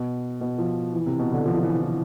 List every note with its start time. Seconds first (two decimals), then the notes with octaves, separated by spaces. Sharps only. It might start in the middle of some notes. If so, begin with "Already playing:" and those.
Already playing: B2
0.41 B2
0.58 F3
0.93 E3
1.06 C3
1.19 B2
1.32 D3
1.46 F3
1.57 F3
1.63 E3
1.81 E3